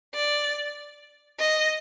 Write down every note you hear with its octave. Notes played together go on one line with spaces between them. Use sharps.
D5
D#5